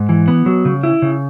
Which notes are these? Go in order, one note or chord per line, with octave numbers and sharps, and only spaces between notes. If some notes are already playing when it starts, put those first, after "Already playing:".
Already playing: G#2
E3
B3
F#3
C#3
E4
C#3